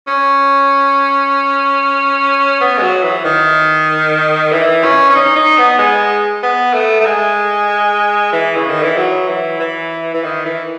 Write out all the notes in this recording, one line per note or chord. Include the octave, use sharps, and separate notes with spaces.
C#4
B3
G#3
F#3
E3
D#3
E3
C#4
C#4
D#4
D#4
B3
G#3
B3
A3
A3
G#3
E3
C#3
D#3
E3
F#3
E3
E3
E3
D#3
E3